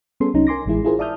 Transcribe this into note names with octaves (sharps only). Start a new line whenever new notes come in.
G3 B3 C#4 G#4 A4 C6
C2 F#3 C#4 D#4 A#5
A#4 G#5 C6 D6 A#6
A1 E3 G#3 E4 G#4
E4 F4 G#4 A#4 C5
D5 E5 A5 D#6 F6 G6